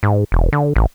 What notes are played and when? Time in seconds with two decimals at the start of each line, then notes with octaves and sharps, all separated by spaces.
0.03 G#2
0.32 E1
0.53 D3
0.76 A1